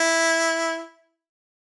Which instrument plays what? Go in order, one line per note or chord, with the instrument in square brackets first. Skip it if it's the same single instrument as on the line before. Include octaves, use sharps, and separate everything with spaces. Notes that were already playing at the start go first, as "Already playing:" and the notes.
Already playing: [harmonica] E4